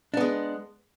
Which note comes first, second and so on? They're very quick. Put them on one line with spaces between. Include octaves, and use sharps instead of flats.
D4 B3 G#3